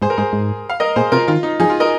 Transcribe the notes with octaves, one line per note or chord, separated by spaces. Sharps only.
G#2 G#4 C5
A#4
G#2 G#4 C5
G#2
F5
A#4 D#5
A#2 G#4 C5
C3 F4 A#4
D#3 F4
D#4
F3 D#4 G#4
F4
A#4 D#5